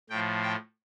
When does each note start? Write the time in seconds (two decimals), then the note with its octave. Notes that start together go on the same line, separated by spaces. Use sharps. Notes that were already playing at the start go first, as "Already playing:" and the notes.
0.10 A2 F3 G5
0.43 G5